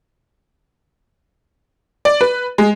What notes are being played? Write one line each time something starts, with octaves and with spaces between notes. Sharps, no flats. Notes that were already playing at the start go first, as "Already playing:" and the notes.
D5
B4
G#3